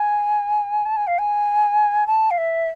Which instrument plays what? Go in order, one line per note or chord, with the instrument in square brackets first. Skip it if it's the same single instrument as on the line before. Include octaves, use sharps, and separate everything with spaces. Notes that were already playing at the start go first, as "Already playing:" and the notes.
Already playing: [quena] G#5
A5
G#5
F5
G#5
A5
F5
E5